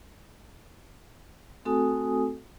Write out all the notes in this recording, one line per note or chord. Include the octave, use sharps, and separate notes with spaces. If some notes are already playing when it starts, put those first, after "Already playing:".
A3 C4 F#4 A4 G#5 D#6